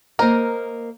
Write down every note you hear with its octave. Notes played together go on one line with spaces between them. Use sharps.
A#3 A#4 C5 D#5